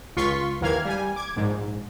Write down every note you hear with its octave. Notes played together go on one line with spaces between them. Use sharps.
C#2 F4 C6 C#6 B6
D#2 E3 A#3 F5 F6 G#6
G3 G#5
D6 G#6
A#1 G#2